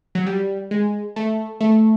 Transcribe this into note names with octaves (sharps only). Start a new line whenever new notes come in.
F#3
G3
G#3
A3
A3